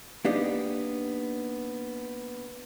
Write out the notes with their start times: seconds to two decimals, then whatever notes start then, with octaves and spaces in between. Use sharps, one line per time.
0.25 A#3 B3 D4 D#4 G4